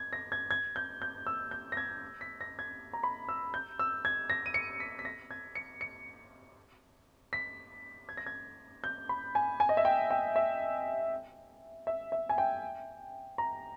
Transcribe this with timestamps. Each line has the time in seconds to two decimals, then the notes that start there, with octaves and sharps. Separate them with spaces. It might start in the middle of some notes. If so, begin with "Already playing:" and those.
Already playing: G#6
0.13 A#6
0.32 G#6
0.51 G#6
0.76 G6
1.02 G6
1.27 E6
1.51 G6
1.72 A#6
1.77 G#6
2.21 B6
2.41 A#6
2.59 G#6
2.93 A#5
3.03 B5
3.29 E6
3.54 G6
3.79 E6
4.05 G#6
4.30 A#6
4.46 D#7
4.54 C#7
4.80 B6
4.99 B6
5.05 A#6
5.31 G#6
5.55 C#7
5.81 C#7
7.33 B6
8.09 G#6
8.17 A#6
8.26 G#6
8.84 G6
9.09 B5
9.35 G#5
9.60 G#5
9.69 D#5
9.77 E5
9.85 G5
10.10 G5
10.36 E5
11.87 E5
12.12 E5
12.29 G#5
12.38 G5
13.38 A#5